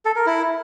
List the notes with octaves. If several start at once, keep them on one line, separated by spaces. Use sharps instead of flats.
A4
A#4
E4